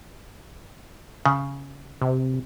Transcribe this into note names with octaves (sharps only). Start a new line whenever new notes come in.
C#3
C3